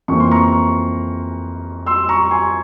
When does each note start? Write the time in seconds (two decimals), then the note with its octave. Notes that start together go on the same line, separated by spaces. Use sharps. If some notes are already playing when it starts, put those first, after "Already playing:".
0.08 F2 E3 A#3 C#6
0.20 C6
0.31 A#5 C#6
1.86 C6 E6
2.09 A#5 C#6
2.31 G#5 C6